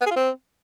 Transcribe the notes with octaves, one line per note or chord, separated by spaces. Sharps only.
B3
G#4
F4
C4